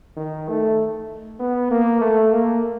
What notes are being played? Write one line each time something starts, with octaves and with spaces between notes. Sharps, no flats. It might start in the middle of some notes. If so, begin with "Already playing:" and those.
D#3
A3
B3
A#3
A3
A#3